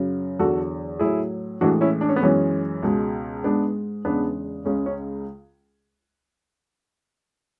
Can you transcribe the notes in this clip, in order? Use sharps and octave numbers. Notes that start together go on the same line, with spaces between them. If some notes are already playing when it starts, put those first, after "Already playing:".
Already playing: F#2 C#3 F#3
E2 D3 F#3 F#4 A4
A2 F#3 E4 G#4
A2 E3 G#3 D4 F#4
C#4 E4
D4
C#4
B3
F#2 E3 G#3 C#4
C#2 B2 G#3
G#2 G#3 B3 D4
E2 C#3 G#3 B3 D4
C#2 C#3 G#3 C#4
C#4